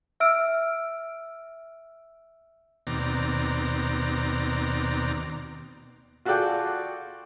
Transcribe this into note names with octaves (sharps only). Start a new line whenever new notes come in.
E5 E6 F6 D7
D#2 B2 C4 D5 A#5
F4 F#4 G#4 A4 D5 G5